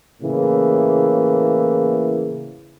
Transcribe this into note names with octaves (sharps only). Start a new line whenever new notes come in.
A2 C#3 E3 A#3